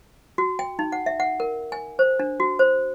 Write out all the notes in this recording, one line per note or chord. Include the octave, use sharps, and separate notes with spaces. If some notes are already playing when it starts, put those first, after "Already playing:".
F#4
G5
D#4
F#5
E5
F#5
A#4
G#5
C5
D4
F#4
C5